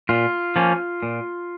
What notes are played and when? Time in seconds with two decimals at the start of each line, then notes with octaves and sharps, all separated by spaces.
0.09 A#2 F4
0.56 F3 A#3 C#4
1.03 A#2